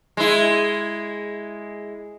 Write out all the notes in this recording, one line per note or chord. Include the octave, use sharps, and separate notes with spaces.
G#3 E4